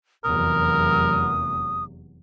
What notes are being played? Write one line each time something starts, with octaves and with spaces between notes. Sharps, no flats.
F1 E2 F#3 A#4 D#6